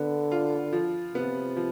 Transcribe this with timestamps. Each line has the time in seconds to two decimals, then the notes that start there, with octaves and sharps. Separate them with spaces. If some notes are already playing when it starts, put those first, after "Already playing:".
Already playing: D3 B3
0.32 F4
0.73 F3
1.15 C3 B3
1.57 F3